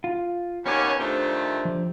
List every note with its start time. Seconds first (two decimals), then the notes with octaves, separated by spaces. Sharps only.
0.04 F4
0.66 D#2 B3 C#4 C#5 D6
1.00 F2 D#3 A3 D4 G4 C5
1.65 F3